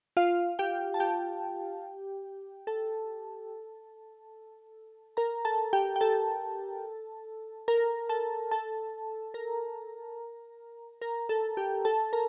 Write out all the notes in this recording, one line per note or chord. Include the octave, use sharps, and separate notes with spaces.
F4 F5
G4 G5
A5
G4 G5
A4 A5
A#4 A#5
A4 A5
G4 G5
G5
A4 A5
A#4 A#5
A4 A5
A4 A5
A#4 A#5
A#4 A#5
A4 A5
G4 G5
A4 A5
A#4 A#5